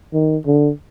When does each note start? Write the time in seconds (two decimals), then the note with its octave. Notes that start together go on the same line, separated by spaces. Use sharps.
0.13 D#3
0.47 D3